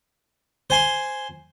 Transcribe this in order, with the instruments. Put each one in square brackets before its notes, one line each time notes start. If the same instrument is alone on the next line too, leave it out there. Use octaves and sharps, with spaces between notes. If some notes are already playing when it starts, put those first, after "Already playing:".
[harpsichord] C5 G#5 C6